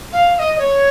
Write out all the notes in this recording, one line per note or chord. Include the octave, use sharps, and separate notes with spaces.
F5
F5
D#5
C#5